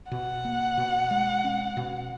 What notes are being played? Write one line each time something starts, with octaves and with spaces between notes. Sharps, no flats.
B2 F#5
A#3
B2
G#3
C#4
B2